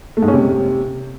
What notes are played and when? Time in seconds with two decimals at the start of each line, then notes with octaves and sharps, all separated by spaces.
0.17 A3
0.23 G#2
0.28 C#4
0.34 C3